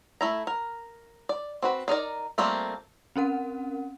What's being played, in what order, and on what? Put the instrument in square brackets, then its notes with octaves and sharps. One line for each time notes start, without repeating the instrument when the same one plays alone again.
[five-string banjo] A3 E4 A#5
A#4
D5
C4 F#4 B4
D4 D#4 A#4 D5
G3 A3 A#3 C4 F4
[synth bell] C4 C#4 A#4 F#5